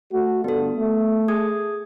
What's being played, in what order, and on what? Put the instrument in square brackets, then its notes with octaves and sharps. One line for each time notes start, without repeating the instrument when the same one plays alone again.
[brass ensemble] A3 F#4
[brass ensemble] G2 D3 [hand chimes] B3 A4
[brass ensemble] A3
[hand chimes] G#4 D#6 G#6